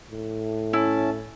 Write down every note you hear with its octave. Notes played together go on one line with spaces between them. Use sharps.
A2
C#4 E4 A5